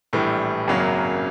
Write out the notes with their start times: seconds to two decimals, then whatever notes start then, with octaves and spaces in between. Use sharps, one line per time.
0.13 A#1 A2 E3 G3
0.68 G#1 F#2 C#3 F#3 A#3